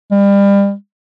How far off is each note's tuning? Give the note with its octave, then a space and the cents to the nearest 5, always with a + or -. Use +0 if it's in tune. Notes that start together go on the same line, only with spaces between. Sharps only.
G3 +30